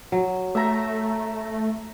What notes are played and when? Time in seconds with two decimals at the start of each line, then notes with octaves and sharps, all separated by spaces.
0.12 F#3
0.55 A3 E5 A#5